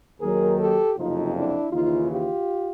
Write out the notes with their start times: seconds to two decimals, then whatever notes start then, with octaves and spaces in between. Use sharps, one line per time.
0.21 D#2 D#3 F#3 G#4 A#4
0.59 G4 A4
0.97 F#1 F2 C3 F3 D#4 F4
1.34 D4 E4
1.72 D#2 C#3 E3 D#4 F4
2.09 F4 G4